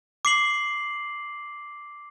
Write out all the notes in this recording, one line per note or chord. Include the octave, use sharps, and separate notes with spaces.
D6 C7 F#7